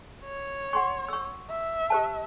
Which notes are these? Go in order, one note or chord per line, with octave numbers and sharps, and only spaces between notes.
C#5
F#5 C6 C#6
C#6 E6
E5
G4 C5 A5